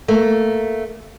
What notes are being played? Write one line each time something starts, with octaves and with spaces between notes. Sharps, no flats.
A3 A#3